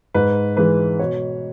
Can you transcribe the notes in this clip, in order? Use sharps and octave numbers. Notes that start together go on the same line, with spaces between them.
G#2 B4
E3 G#3 B4
B2 C#5